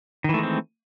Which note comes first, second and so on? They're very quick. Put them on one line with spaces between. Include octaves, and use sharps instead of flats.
D#3 E3 A3 G#3 C4